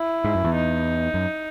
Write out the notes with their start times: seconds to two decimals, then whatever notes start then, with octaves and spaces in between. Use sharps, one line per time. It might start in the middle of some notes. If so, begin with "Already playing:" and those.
Already playing: E4
0.25 G#2
0.35 F#2
0.44 E2
0.55 D#4
1.14 F#2